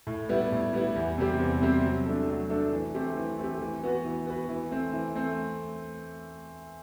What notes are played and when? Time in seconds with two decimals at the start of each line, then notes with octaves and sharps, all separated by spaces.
0.07 A2
0.29 G3 B3 E4
0.52 A2
0.73 G3 B3 E4
0.96 E2
1.18 C3 G3 C4 G4
1.40 E2
1.61 C3 G3 C4 G4
1.83 F#3
2.06 A3 D4 A4
2.29 F#3
2.50 A3 D4 A4
2.72 E3
2.94 A3 C4 G4
3.16 E3
3.39 A3 C4 G4
3.61 E3
3.83 B3 F#4 B4
4.05 E3
4.26 B3 F#4 B4
4.49 E3
4.71 A3 C4
4.93 E3
5.15 A3 C4